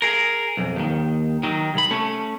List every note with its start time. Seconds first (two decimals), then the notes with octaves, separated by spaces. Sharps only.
0.02 G#4 A#4
0.57 B1 F2
0.76 D#2 D#3
1.43 D#3 F#3
1.74 C2 B5
1.91 A3 C#4